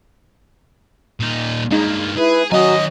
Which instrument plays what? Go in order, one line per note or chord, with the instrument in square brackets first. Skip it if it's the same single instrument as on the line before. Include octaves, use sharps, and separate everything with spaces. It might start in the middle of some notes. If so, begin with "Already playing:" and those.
[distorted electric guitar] A#2 D#4
[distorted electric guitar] G2 A#3 [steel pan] G#3 D#4
[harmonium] E4 B4 [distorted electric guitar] G#4
[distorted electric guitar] D#3 G#5 [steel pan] F#3 [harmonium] F#4 A#5 [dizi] D#5